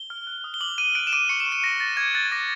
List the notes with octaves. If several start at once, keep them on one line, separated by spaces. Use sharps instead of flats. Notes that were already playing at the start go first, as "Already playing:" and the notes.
Already playing: G7
F6
F#6
D#6
G7
D6 F#7
F6 D#7
F#6 D7
E7
D6 D#7
C#6 C#7
E7
C#6
D#7
C#6 A#6
C#6 A6
D6 G#6
F#6 A6
D6 A#6